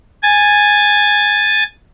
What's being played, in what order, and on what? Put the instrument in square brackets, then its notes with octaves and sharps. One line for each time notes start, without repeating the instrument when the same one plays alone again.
[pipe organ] G#5 A6